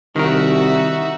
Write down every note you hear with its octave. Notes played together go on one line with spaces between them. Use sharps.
C2 D#3 D#4 F#4 A#4 E5